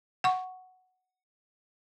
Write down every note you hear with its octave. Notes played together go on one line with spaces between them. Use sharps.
F#5 C#6